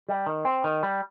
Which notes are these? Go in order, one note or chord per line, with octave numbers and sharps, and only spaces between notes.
G3
D#3
C4
D#3
G3